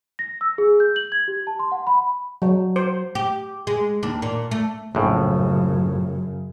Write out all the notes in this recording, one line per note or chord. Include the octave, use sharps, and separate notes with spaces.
A#6
E6
G#4
G6
F#7
G#6
G4
A5
C6
F#5
B5
F#3
C5
G4
G#3
D#2 D4
A#2
A3
A#1 F#2 A2 C#3